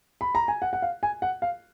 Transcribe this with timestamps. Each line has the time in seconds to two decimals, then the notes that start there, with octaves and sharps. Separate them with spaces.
0.21 B5
0.35 A#5
0.48 G#5
0.62 F#5
0.73 F#5
0.82 F5
1.03 G#5
1.22 F#5
1.42 F5